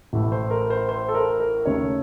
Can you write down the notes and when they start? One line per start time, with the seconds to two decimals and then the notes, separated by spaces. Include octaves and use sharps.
0.13 A1 A2 A3
0.32 C5
0.50 A#4
0.70 C5
0.89 C5
1.09 A4
1.14 A#4
1.40 A#4
1.65 D#2 C#3 A3 C#5